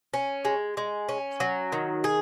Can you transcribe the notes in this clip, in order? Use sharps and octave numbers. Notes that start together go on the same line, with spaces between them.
C#4
G#3
G#3
C#4
F#3
D#3
G#4